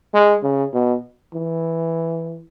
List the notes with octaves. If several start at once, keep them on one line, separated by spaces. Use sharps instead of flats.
G#3
C#3
B2
E3